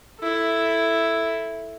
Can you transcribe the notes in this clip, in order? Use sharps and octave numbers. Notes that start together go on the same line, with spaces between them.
E4 A4